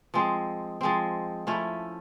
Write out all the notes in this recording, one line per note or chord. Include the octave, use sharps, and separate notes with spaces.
F3 G#3 C4
F3 G#3 C4
F3 A3 C#4 E4